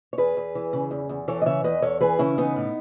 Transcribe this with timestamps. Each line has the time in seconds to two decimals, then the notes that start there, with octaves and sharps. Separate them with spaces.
0.13 C#5
0.18 E2 G#4 B4
0.37 E2
0.55 E3
0.73 C#3
0.91 E2
1.09 E2
1.28 E3 A4 C#5
1.42 D#5
1.46 C#3 C#5 E5
1.64 E2 B4 D#5
1.82 E2 A4 C#5
2.01 E3 G#4 B4
2.19 C#3 C#4 E4
2.38 E3 B3 D#4
2.56 A2